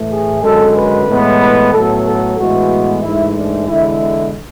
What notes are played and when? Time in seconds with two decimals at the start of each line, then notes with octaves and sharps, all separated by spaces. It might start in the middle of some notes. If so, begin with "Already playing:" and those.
Already playing: A2 E3 A3
0.10 G#4
0.42 F#2 D3 G#3 A4
0.75 B4
1.08 A2 E3 G#3 B3
1.40 B4
1.72 A2 F#3 B3 A4
2.05 A4
2.38 A2 E3 G#3 B3 F#4
3.02 G#2 E3 A3 E4
3.36 D4
3.68 E2 D3 G#3 E4